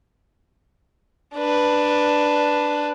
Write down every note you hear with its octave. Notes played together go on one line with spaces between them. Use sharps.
D4 B4